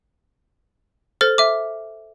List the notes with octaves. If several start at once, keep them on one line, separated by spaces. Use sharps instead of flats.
A4 C5 F6 A6
E5 D6